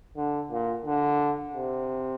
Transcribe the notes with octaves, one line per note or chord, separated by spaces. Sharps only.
D3
A#2
D3
C3